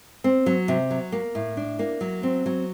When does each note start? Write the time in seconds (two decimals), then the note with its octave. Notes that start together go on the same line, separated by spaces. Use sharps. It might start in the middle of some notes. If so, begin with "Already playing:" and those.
0.24 C4
0.46 F#3
0.68 C3
0.91 F#3
1.12 A#3
1.35 A2
1.57 D4
1.79 A#3
2.01 F#3
2.23 C4
2.46 F#3